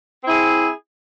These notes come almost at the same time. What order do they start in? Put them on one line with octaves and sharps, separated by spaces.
C4 E4 G#4